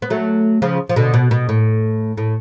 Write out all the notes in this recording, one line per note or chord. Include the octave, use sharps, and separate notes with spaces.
B3
F#3 A3
C#3 F3
F3
B2 D3
B2
B2
A2
A2